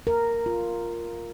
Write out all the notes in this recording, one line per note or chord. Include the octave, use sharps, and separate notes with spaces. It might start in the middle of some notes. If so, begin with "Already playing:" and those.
A#4
F4